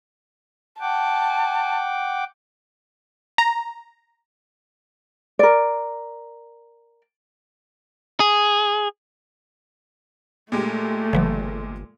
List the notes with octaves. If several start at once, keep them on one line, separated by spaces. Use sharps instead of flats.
F#5 G5 A5 D6
A#5
A#4 D5
G#4
A#2 G#3 A3 G4
G1 C#3 E3 F#3